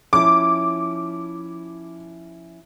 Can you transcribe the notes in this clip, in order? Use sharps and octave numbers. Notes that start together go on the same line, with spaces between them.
F3 C#4 E4 D6